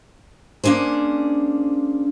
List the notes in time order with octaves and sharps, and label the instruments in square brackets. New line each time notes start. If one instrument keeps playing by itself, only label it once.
[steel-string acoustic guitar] A#3 C#4 D4 G#4 C5